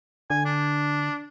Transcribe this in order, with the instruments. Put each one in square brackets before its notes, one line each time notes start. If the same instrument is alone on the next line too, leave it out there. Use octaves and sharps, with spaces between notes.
[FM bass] D3 [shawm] G#5
[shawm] D4